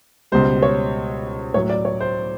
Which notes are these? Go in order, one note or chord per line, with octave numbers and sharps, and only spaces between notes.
C#2 B2 G3 C5
C#5
A2 F#3 C#5
D5
C#5
C5